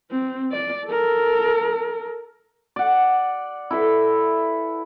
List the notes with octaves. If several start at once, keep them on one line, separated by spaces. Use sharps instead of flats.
C4
D5
A4 A#4
D5 F#5
E4 A4 B4 E5